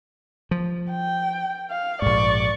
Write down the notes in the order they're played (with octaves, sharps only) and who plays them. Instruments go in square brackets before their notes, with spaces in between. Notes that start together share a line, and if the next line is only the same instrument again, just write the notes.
[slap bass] F3
[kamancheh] G5
F5
[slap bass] A#1 G#2 [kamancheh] D5 C#6